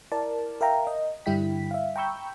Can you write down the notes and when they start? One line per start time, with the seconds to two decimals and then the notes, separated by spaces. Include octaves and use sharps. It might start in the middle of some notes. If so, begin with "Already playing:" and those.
0.12 E4 A#4 D5 A5
0.61 A#4 E5 F5 G5 A#5
0.87 D#5
1.26 G2 D3 G3 E4 G5 B6
1.71 E5 F5
1.96 G5 A#5 B5 C#6 E6 G6